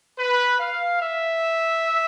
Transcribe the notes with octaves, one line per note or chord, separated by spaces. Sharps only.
B4
F5
E5